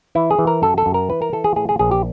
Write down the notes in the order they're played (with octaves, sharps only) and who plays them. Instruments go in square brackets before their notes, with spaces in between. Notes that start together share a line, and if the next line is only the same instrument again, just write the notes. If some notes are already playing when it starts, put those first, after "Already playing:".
[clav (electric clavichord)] E3 E4
G#4
E3
A#4
F#2 A4
A4
F#2
A#4
E3 B4
A#4
E3 A4
G#4
A2 G#4
G#4
A#1 G#4
G4